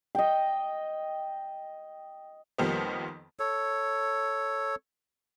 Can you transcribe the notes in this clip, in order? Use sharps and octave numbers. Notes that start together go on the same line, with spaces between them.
D#5 G5
F2 D#3 F3 G3 A#3 B3
A4 C#5